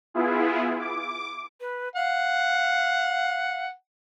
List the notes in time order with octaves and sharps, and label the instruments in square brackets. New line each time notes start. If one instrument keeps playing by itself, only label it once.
[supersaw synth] B3 E4 F4 G#4
D6
[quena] B4
[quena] F5 [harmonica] F#5